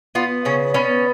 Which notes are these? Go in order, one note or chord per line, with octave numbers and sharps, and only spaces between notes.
B3 F4
C#3 C#4
B3 C#4